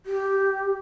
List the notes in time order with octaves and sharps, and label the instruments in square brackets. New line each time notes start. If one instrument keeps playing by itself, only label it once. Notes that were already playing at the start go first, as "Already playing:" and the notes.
[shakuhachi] G4